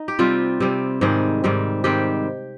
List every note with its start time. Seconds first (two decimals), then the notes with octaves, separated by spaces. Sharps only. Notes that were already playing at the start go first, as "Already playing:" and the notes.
Already playing: D#4
0.08 G4
0.19 C3 G3 C4 F4
0.60 C3 G3 C4
1.01 G#2 D#3 G3 C4 G#4
1.44 G#2 D#3 G3 C4
1.84 G#2 D#3 G3 C4 G4